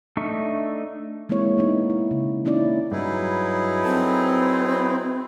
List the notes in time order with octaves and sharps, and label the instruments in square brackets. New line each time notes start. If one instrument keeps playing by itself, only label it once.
[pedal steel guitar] A3 D4 D#4 E5 C#6
[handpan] G#3 A#3 C4 E4 C#5
A#3 B3 D#4
E4
C#3
A#3 C#4 D#4 E4 D5
[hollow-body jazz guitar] G2 [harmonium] F#3 B4 [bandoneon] D#4 E4 G#4
[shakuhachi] C4 [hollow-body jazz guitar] A4